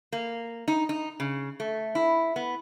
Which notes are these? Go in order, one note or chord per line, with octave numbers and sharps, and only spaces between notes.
A#3
D#4
D#4
C#3
A3
E4
B3